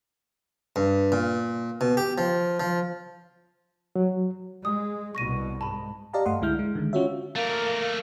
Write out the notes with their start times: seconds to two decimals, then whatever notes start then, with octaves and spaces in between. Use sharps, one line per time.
0.76 G2
1.12 A#2
1.81 B2
1.97 G4
2.18 F3
2.60 F3
3.96 F#3
4.65 G#3 D#6
5.15 C2 B2 C#6 A#6 D#7
5.61 G#2 A5 B5
6.13 G4 D5 D#5 F5 A5 A#5
6.26 G2 A3 D#5 F#5 C6
6.41 C#2 D3 G#3 E4 F6 G6
6.59 G#3
6.75 D3 D#3 G#3
6.93 C#4 F4 F#4 C#5 E5
7.36 A3 A#3 A#4